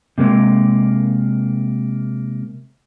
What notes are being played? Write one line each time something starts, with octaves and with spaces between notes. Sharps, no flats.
C3 G#3 A#3